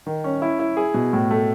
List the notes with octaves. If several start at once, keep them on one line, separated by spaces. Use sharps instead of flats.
D#3
C#4
E4
E4
G#4
B2
A2
A3